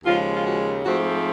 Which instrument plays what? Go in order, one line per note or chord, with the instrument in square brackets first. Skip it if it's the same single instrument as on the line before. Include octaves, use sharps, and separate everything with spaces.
[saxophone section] D#2 C#3 F3 G#3 F4
F4
F#4
G#2 F3 A3 C4 F#4